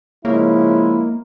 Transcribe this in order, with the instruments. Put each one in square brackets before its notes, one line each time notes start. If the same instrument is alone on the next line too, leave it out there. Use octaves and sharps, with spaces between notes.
[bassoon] C#3 [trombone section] F3 E4 [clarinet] G#3 [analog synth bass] A#3